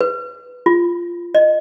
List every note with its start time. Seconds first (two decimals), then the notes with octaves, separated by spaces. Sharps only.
0.01 B4
0.66 F4
1.35 D#5